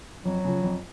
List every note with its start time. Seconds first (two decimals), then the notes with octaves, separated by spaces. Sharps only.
0.25 F2 F#3
0.45 C#3 F3
0.64 F2